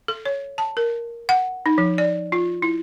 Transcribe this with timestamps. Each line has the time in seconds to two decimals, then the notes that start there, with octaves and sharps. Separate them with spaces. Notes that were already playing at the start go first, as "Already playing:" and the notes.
0.08 A4
0.26 C#5
0.58 A5
0.77 A#4
1.29 F#5
1.66 D#4
1.78 F3
1.98 D5
2.32 F4
2.62 E4